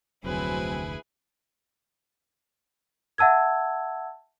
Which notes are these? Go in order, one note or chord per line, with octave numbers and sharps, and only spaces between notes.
F1 D2 F#3 C4 E4 G#4 B4 G#5
E5 F#5 A5 E6 G#6